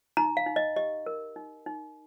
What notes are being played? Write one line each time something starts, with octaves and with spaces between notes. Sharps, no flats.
D#4 A#5
F5
D#4
D#5
G4 D#5
A#4
D#4
D#4